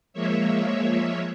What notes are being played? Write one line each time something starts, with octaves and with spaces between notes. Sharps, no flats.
F3 G#3 A#3 C#5 E5